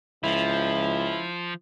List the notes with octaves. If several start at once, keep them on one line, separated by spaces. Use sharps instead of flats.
C#2 F3 E4